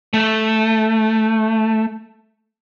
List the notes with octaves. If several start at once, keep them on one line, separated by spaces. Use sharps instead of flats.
A3